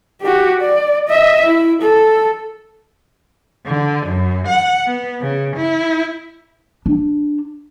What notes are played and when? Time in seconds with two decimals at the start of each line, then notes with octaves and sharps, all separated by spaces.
0.21 F#4 G4
0.61 D5
1.08 D#5 E5
1.46 E4
1.82 A4
3.67 D3
4.07 F#2
4.48 F#5
4.86 B3
5.21 C#3
5.57 E4
6.86 D4